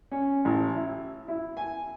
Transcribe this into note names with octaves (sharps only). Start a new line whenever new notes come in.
C#4
A1
E4
E4
G#5